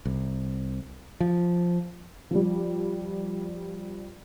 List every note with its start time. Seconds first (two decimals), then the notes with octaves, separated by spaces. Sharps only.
0.05 C2
1.20 F3
2.31 F3 G3